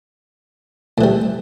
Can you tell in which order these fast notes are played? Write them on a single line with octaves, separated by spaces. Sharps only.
A2 E3 G3